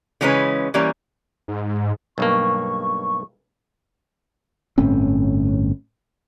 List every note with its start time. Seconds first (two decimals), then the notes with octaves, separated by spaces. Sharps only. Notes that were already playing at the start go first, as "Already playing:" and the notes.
0.21 C#3 E3 G#3 C#4 D#4 B4
0.74 E3 G3 A#3 C#4
1.48 G#2
2.18 B1 G2 A#3 C#6
4.78 G1 A2 C4 C#4